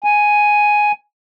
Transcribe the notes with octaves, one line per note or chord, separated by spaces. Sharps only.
G#5